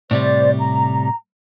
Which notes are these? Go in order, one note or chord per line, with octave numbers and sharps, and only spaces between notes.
A2 C3 G3 C5 D5
A#5